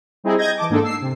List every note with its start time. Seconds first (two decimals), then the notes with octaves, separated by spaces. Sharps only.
0.24 G3 C4 D#4 E4 G#4
0.38 D#5 G6 G#6 A#6
0.57 E3 A5 D6
0.69 G#2 A#3 D4 D#4 A4
0.84 E6 C7
1.01 C3